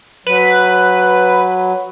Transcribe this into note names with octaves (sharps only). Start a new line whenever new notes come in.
F#3 B4